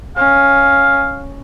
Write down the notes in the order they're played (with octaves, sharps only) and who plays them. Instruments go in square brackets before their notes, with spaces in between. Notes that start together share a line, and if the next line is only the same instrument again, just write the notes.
[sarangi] C#4 [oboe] F5